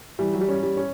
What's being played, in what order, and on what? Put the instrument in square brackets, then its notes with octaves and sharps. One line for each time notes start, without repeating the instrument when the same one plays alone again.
[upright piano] E3 [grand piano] G3
[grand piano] F#3
G3
[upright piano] C#4
[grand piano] G3
[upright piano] C#4